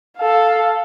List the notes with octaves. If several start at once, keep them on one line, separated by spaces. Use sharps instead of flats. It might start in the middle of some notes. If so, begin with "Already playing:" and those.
A4 F5